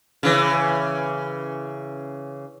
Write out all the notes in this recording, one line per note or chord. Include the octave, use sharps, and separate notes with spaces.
C#3 E3